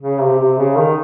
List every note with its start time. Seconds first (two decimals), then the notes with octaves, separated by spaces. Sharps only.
0.02 C#3
0.21 C3
0.39 C3
0.58 C#3
0.77 D#3